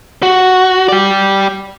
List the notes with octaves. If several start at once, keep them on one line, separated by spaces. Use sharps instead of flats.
F#4
D5 G5